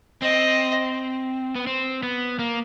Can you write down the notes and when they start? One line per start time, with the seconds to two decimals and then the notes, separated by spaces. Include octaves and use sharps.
0.22 C4 D#5
1.55 B3
1.67 C4
2.03 B3
2.39 A#3